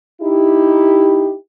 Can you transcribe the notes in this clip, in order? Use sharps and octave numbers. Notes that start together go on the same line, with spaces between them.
D#4 E4 G4